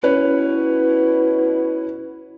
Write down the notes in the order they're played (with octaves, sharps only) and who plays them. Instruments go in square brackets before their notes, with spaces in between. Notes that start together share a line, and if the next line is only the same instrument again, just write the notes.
[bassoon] B2 [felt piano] C#4 B4 C#5 [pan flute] E4